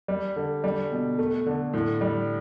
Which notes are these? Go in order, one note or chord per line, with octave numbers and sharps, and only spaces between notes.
G3
D3
G3
B2
A3
D3
A2
G3